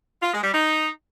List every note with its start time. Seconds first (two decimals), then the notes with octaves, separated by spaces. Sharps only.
0.22 F4
0.33 G#3
0.43 G3
0.54 D#4